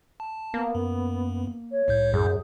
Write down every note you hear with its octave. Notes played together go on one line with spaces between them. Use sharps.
A5
A#3 B3
F#2
C#5
C2 A2 G6
F#2 G#4